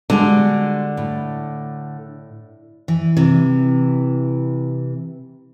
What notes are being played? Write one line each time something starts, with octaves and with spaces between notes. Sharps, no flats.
D3 G3 G#3 F#4
A2
E3
C3 E3